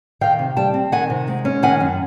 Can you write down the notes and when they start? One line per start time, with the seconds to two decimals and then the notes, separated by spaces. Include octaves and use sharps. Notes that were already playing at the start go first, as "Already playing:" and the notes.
0.21 D#3 F5 G5
0.39 C3
0.57 G3 G5 A5
0.74 C4
0.92 D#3 F#5 G#5
1.10 C3
1.28 G#3
1.45 C#4
1.63 D#3 F#5 G#5
1.80 F#2